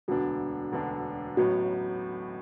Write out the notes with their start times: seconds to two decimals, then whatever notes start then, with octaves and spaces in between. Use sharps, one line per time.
0.08 E1 D2 D3 B3 D4 F#4
0.72 E1 D2 D3 B3 D4
1.37 A1 A2 F#3 B3 F#4